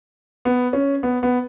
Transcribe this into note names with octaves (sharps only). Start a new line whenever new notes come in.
B3
C#4
B3
B3